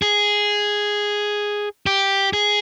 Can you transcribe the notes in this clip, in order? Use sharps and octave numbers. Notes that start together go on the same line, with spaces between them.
G#4
G4
G#4